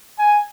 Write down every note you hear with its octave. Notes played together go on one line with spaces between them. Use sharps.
G#5